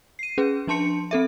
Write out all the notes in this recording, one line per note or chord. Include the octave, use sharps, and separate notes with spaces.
C7 D#7
C#4 G#4 B4
F3 D4 A5 C6 C#7
C4 A4 E5